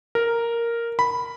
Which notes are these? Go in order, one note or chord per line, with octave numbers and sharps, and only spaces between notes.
A#4
B5